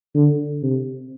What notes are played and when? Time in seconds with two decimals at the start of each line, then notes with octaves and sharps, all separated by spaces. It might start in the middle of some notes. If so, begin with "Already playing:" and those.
0.14 D3
0.63 C3